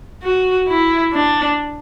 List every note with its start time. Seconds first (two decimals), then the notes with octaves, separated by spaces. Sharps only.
0.23 F#4
0.68 E4
1.13 D4